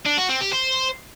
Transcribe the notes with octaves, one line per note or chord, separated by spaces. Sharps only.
D4
F#4
C4
G4
C5